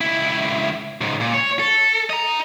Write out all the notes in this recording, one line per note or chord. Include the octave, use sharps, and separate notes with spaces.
C#2 E4
C#2 G#2
A#2
C#5
A4
D#5 A#5